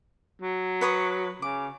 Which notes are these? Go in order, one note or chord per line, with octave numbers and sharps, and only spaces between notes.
F#3
B4 C#5 D#6
C#3 D6